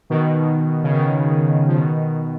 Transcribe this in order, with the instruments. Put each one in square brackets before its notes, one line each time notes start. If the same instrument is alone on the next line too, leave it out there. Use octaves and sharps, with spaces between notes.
[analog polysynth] B2 D#3
C#3
B2 D#3
F3
B2 D#3